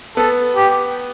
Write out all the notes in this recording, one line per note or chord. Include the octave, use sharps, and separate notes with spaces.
B3 A4
G4